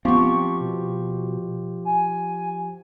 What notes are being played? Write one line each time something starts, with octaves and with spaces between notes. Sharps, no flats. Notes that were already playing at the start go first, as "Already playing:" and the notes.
F3 B3 C4 F4 G4 C#6
B2
G#5